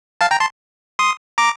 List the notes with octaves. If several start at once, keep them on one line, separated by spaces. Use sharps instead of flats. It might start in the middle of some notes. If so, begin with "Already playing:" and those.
F5 A5
G5 A#5
A5 C6
C6 D#6
A#5 D6